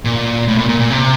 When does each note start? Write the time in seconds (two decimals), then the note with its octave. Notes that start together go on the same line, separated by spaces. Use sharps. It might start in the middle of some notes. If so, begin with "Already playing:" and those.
0.05 A#2
0.48 A2
0.58 A#2
0.69 A#2
0.80 A#2
0.90 C3